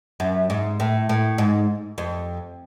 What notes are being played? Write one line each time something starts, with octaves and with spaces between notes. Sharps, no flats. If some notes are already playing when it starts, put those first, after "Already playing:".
F#2
G#2
A2
A2
G#2
F2